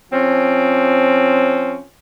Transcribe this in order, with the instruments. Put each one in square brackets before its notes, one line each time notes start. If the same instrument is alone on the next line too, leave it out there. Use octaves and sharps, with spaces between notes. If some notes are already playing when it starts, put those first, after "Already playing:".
[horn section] F3 C4 C#4